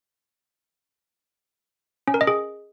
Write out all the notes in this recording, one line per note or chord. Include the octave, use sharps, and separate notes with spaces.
C#4
A#4
D#5
G#4